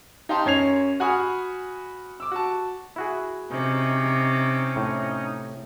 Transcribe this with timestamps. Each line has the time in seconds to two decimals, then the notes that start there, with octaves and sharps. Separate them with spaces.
0.29 D#4 G4 F5 G5 A5 C6
0.45 F#2 C#4 G#6 C7 F7
1.00 F#4 F#5 G#5 B5 D#6 F6
2.20 D6 E6
2.32 F#4 A5
2.96 E4 F#4 G#4
3.51 C3 C#4 D#4 D#5
4.76 A2